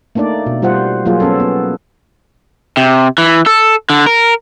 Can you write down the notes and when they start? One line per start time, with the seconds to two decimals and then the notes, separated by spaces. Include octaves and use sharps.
0.15 A3 A#3 D4 D#4 D5
0.46 B2
0.62 G3 F4 C5 F#5
1.05 F#3 A#3 F4 G#4
1.20 B3 C#4 A4
1.40 B3
2.77 C3
3.18 E3
3.46 A4
3.90 D3
4.07 A#4